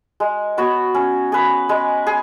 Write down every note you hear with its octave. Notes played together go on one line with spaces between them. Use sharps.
G#3
B3 F#4 C#5
C#4
G#4 B4
G#3
G#4